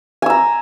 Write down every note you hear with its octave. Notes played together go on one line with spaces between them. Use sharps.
G#5 A#5 E6